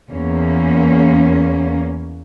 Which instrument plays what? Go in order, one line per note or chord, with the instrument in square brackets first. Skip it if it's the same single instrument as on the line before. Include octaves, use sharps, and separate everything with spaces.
[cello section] E2 A#3 C#4